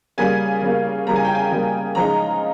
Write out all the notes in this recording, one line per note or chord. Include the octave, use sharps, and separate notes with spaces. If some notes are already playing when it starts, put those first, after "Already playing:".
C#3 G3 A#3 G#5
C#3 G3 A#3
C#3 G3 A#3 A#5
G#5
G5
G#5
C#3 G3 A#3
C#3 F3 G#3 D#4 A#5